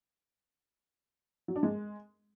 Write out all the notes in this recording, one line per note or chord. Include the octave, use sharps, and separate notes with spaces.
F#3
D4
G#3